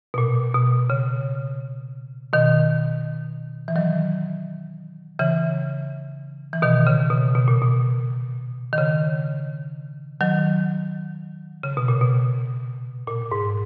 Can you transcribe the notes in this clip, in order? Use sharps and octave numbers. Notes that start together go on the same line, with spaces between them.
B2
A#2
B2
C#3
B2 D#3
E3
D#3 F#3
C#3 E3
E3
B2 D#3
C#3
B2
B2
A#2
B2
D#3
C#3
D#3 F#3
C#3
B2
A#2
B2
A#2
G#2